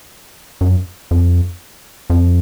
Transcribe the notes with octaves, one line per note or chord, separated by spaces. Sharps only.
F#2
F2
F2